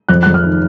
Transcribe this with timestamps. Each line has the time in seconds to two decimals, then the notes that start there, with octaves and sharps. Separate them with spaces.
0.09 F2 F#6
0.23 F2 F#6
0.34 F6
0.43 D#3